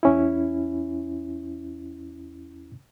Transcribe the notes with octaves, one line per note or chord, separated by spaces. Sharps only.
E2 C#4 E4